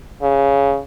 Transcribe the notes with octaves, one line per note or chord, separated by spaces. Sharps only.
C#3